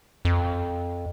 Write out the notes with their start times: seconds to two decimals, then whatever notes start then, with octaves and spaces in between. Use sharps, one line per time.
0.25 F2